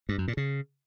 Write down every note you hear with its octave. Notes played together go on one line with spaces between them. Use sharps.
G2
F#2
A#2
C#3